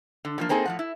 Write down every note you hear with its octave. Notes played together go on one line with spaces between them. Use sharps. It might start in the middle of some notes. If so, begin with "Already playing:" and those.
D3
D3 F3 A#3
A#3 C4 D#4 G#4 A4
A2 F3 F#5
E4